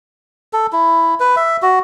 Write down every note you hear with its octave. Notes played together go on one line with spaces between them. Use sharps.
A4
E4
B4
E5
F#4